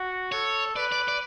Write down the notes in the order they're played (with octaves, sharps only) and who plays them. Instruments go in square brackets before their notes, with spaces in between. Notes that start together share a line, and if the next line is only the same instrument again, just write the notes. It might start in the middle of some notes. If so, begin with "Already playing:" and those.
Already playing: [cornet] F#4
[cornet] A4 [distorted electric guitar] C#5
[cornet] B4 [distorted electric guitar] D5
[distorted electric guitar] D5
D5